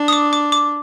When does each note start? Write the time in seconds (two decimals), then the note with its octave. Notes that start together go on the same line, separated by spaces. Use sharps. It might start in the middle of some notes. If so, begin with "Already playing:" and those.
Already playing: D4
0.08 D#6
0.13 D6
0.33 D6
0.52 D6